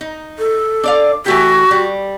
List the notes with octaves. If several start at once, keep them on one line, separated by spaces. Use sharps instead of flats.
D#4
A4
D4 D5 F5
E3 A3 F#4 G4
G3